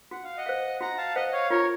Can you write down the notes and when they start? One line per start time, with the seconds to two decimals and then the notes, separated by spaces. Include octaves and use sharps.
0.11 F#4 F#5
0.24 F5
0.37 D#5 F#5
0.46 C5 F5
0.81 F#4 F#5 A#5
0.98 F5 A5
1.15 C5 D#5 F5 F#5
1.29 D#5
1.33 C#5 F5
1.50 F4 A#4 C#5